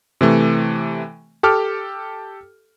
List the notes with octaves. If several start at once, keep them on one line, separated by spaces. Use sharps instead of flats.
C3 E3 A3
G4 A4 D6 F6